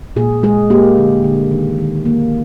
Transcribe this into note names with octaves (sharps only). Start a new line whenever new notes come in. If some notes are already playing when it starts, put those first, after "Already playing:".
A#2 G#4
G#3 G#4
A#3 G4
D3
D3
D#3
D#3
A#3